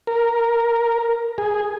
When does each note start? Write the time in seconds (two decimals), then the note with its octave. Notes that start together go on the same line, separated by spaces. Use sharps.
0.07 A#4
1.38 G#4